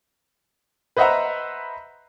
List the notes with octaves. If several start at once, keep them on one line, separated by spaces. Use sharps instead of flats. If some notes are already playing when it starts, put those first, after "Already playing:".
B4 C5 D#5 E5 F#5 A#5